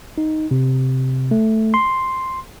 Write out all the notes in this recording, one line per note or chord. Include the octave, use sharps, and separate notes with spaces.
D#4
C3
A3
C6